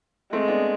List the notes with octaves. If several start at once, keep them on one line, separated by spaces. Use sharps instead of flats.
G#3 A3 C4
B3 D4